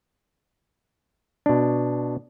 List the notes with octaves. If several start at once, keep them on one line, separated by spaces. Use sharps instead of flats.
B2 D4